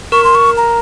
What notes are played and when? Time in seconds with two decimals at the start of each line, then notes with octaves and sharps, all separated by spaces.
0.12 A#4 C#6
0.24 C6
0.35 C#6
0.57 A#5